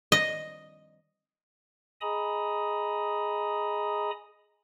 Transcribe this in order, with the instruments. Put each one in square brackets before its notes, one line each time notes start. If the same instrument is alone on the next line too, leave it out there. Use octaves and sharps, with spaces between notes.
[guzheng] D#5
[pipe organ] G#4 D#5 G#5 A#5 B5 D#6